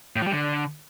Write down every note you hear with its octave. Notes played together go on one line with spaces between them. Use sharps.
A2
F3
G3
D3